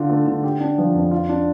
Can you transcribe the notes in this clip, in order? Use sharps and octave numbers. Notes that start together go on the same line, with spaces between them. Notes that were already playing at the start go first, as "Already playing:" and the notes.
Already playing: D3 F4
A3
D3
G4
D4
F3
F2
F4
D4